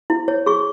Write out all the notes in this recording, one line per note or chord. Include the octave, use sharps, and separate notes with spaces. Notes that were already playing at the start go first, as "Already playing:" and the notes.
E4
C#5
G#4 C#6